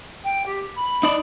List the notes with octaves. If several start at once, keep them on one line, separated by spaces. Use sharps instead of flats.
G5
G4
B5
D#4 D5